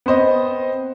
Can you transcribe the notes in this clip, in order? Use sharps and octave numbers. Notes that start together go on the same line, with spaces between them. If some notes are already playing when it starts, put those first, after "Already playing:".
B3 C4 C5 D#5